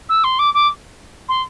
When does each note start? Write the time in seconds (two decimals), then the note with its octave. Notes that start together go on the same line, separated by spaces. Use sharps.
0.09 E6
0.24 C6
0.39 D6
0.54 D6
1.29 C6